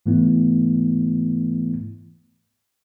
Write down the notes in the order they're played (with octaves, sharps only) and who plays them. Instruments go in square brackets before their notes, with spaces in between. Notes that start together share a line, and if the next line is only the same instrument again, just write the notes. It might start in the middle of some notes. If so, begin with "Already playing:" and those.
[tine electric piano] G#2 E3 A3 B3 E4